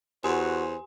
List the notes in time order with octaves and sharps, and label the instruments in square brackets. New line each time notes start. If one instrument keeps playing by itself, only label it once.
[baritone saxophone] E2 [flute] F#4 [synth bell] G4 G#5 C6 [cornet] C5